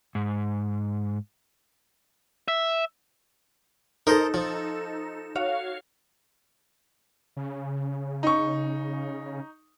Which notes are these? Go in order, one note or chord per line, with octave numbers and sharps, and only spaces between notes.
G#2
E5
D#4 A4 A#4 C5 D#5
F3
F#4 C#5 F5
C#3
D#4 C#6